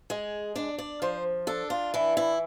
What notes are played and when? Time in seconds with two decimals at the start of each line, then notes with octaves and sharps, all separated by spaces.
0.10 G#3 G#4
0.56 D4 D5
0.78 D5
1.02 F3 C5
1.47 D4 A4
1.70 F4
1.94 E3 E4
2.17 E4